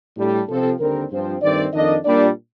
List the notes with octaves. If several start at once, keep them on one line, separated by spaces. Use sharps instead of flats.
A2 G3 D4
C3 F3 C4 A4
D#2 D3 G3 C4 A#4
G2 F3 C4 C5
G2 D#3 A3 C4 D5
F2 D#3 A#3 D4 D#5
A#2 G3 D4 D5